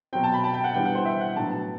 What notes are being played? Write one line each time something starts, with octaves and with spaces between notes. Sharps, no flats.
B2 F#3 C4 G5
A5
B5
A5
G5
F#5
E3 G3 B3 D4 G5
F#5
C5
E5
F#5
A2 F#3 B3 D4 A5
A5